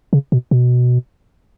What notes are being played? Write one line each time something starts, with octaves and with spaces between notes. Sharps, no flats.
C#3
B2
B2